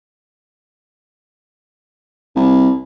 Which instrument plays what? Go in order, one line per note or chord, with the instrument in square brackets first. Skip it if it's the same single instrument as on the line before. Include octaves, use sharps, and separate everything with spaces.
[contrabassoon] C2